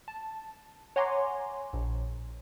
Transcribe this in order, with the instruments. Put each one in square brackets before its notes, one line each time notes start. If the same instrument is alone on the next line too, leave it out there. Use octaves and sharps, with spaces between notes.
[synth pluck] A5
C#5 F#5 G#5 A#5 C6 D6
A#1